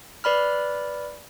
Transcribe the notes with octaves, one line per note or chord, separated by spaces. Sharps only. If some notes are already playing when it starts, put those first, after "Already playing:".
B4 D5 B5 F6